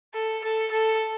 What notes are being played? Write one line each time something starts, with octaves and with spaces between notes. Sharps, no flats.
A4
A4
A4